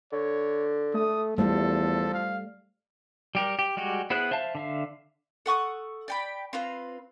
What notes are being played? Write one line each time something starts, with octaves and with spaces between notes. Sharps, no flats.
D3 C#5
A3 D#6
E2 F3 G3 A3 A4
F5
G3 G4 A#4
G4
G3 G#3 F#4 G4
B3 E4 G#4 C5 F#6
C5 E5 F5 A5
D3 E5 F5
A4 F#5 C#6 D#6
D5 G5 B5
C4 F4 B4